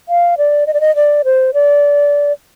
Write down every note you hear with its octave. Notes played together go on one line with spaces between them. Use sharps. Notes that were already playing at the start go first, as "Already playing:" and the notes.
F5
D5
D#5
D5
D#5
D5
C5
D5